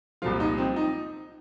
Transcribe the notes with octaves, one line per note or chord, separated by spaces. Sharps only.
C2 A#2 F3 F4
D#4
C4
D#4